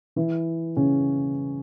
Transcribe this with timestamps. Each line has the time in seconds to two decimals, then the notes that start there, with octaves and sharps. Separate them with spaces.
0.16 E3 E4
0.77 C#3 C#4